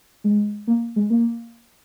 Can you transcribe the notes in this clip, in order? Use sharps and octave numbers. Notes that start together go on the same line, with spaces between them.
G#3
A#3
G#3
A#3